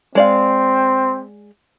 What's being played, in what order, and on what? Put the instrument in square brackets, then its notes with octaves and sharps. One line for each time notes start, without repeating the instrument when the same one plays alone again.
[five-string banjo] G#3 D5 F5 [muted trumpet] C4